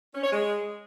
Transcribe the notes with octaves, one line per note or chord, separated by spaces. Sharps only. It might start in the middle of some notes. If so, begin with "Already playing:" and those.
C#4
C#5
G#3